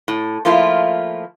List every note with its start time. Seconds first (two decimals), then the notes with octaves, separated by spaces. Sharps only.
0.08 A2
0.45 F3 A3 A#3 E4 F4